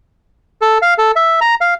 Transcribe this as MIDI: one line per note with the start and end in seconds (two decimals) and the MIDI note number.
0.61 0.78 69
0.82 0.94 77
0.98 1.12 69
1.16 1.40 76
1.41 1.55 82
1.61 1.74 77